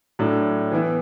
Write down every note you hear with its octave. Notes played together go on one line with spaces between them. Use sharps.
A2 F#3 D4 A4
E3 B3 E4